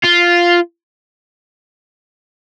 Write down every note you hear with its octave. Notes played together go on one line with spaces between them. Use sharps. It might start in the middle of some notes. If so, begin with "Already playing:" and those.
F4